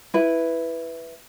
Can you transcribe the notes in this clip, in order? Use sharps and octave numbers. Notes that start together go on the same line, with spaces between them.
E4 B4